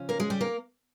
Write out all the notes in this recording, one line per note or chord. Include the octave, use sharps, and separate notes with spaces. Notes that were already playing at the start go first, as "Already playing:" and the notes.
Already playing: C#3 F3 C#4
A#3 A#4
G#3 G#4
G3 G4
A#3 A#4